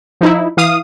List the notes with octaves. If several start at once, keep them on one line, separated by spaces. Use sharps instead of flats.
F3 D#4 E4
E3 F5 D#6